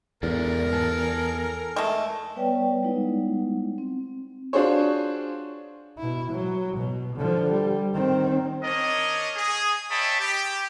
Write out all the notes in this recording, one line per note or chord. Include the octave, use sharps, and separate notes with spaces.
E2 G#2 A4 A#4 D5
A4 G#5 A5
G#3 A3
G3 B3 B4 C#5 D5 G5
G3 G#3 B3 D#4 E4 F#5
C4
D4 F4 F#4 G#4 C5 C#5
B2 E4
F#3
B2
D3 F3
G3
D#3 C4
D4 A#4 C#5 D#5
G#4
C#5 D#5 E5 G5 A5 B5
G4